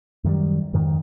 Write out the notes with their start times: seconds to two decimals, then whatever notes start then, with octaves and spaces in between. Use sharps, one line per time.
0.24 F#2 D#3 F#3 G3
0.73 F2 G#2 D#3